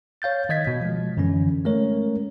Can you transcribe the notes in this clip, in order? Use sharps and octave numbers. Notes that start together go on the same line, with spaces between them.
C#5 F5 G6 A6
D#3 D#5 G#6 B6
B2
F3 G#3
F#2 D3 E3 C#4
G#3 A3 C#4 A#4 C#5